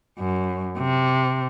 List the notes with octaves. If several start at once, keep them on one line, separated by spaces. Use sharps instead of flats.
F#2
C3